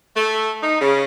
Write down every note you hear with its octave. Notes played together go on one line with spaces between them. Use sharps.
A3
D#4
C#3